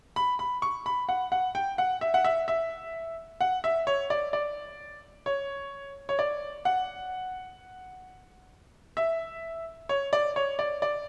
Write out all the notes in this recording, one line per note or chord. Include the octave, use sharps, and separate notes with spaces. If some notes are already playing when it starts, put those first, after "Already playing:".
B5
B5
C#6
B5
F#5
F#5
G5
F#5
E5
F#5
E5
E5
F#5
E5
C#5
D5
D5
C#5
C#5
D5
F#5
E5
C#5
D5
C#5
D5
D5